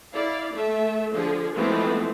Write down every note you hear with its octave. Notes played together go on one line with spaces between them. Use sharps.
E4 D5 F5
A3 A4 E5
D3 F3 G#4
E3 F3 G#3 A3 B3 C4